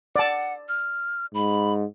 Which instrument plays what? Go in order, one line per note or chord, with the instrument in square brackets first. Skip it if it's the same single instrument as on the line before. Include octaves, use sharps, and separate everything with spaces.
[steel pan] D5 A5 [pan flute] F#5
[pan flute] F6
[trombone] G#2 [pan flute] B5